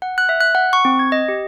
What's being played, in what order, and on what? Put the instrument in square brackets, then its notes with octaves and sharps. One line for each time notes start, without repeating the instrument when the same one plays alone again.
[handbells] F#5
F#6
E5
F#6
F#5
C#6
C4
G#6
D#5
G4